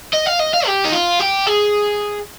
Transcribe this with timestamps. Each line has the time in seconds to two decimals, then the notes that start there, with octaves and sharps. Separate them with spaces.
0.14 D#5
0.27 F5
0.40 D#5
0.54 F5
0.67 G4
0.85 D#4
0.93 F4
1.20 G4
1.47 G#4